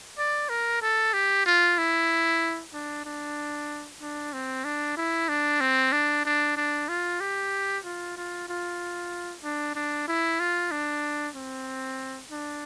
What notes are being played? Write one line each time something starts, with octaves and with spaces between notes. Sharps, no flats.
D5
A#4
A4
G4
F4
E4
D4
D4
D4
C4
D4
E4
D4
C4
D4
D4
D4
F4
G4
F4
F4
F4
D4
D4
E4
F4
D4
C4
D4